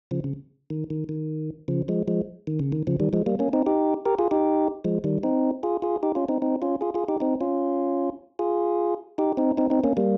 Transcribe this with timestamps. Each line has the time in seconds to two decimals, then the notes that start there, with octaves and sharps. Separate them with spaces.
0.11 C#3 F3
0.24 C#3
0.70 D#3
0.90 D#3
1.09 D#3
1.68 C#3 F3
1.88 F3 G#3
2.08 F3 G#3
2.47 D#3
2.59 C#3
2.72 D#3
2.87 C#3 F3
3.00 D#3 G3
3.13 F3 G#3
3.26 G3 A#3
3.39 A#3 C#4
3.53 C4 D#4
3.66 D#4 G4
4.05 G4 A#4
4.19 F4 G#4
4.31 D#4 G4
4.85 F3 G#3
5.04 D#3 G3
5.23 C4 D#4
5.63 F4 G#4
5.82 F4 G#4
6.03 D#4 G4
6.15 C#4 F4
6.28 C4 D#4
6.42 C4 D#4
6.62 C#4 F4
6.81 F4 G#4
6.94 F4 G#4
7.08 D#4 G4
7.20 C4 D#4
7.41 C#4 F4
8.39 F4 G#4
9.18 D#4 G4
9.37 C4 D#4
9.57 C4 D#4
9.70 C4 D#4
9.84 A#3 C#4
9.97 G3 A#3